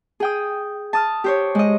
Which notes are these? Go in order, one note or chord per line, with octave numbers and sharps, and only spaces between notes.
G#4 G5 D#6
A5 D#6 F6
G4 C5 C#5
G#3 D#5